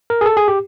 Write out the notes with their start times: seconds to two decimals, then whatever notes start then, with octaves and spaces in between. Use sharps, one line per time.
0.10 A#4
0.21 G#4
0.26 A4
0.37 G#4
0.48 G4